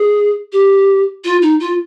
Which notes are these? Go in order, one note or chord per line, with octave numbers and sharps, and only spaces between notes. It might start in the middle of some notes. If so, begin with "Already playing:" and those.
Already playing: G#4
G4
F4
D#4
F4